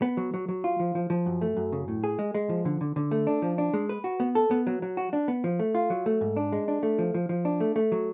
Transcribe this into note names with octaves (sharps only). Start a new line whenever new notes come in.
B3
F#3
F#3
F#3
F4
F3
F3
F3
F#2
A3
F#2
C#3
A2
G#4
G#3
G#3
F3
D3
D3
D3
A3
D4
F3
D4
G#3
B4
F#4
B3
A4
B3
F#3
F#3
F#4
D4
B3
F3
A3
F4
F#3
A3
G#2
D4
G#3
D4
A3
F3
F3
F3
D4
A3
A3
F#3